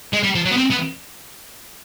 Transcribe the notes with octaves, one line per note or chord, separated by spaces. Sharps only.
G#3
G3
F3
F#3
B3
C4
B3